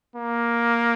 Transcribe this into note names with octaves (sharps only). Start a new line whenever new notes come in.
A#3